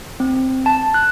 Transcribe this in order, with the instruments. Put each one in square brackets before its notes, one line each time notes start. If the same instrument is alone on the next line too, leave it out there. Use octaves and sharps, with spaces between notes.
[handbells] C4
A5
F#6